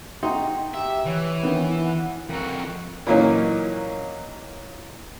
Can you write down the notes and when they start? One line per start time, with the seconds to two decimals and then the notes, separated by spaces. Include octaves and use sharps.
0.23 D#4 F#4 G5 C6
0.74 G4 E5
1.06 E3 C#5
1.43 D#3 B3
1.85 F#5
2.30 F2 F#4 A#4
3.07 A#2 E3 F#3 A#3 C#4 D#4